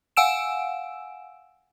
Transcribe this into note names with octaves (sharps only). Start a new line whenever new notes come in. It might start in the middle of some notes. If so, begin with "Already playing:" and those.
F5 F#5 G#5 E6 D7 E7